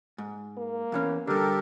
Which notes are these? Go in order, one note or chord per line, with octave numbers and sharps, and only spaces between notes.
G#2
A#3
E2 E3 C#4
D3 G3 G4 A4 A#4